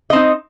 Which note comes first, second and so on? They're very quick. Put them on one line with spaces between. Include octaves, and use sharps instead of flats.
D#5 C4 D#4